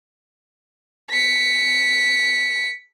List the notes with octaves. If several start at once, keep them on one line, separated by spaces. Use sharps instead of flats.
B6 C#7